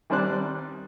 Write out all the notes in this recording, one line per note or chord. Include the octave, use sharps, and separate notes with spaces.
D#3 G3 C4 C5 D5 F#6